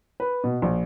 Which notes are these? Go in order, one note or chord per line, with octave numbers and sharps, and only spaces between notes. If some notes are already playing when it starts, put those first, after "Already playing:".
B4
B2
A#1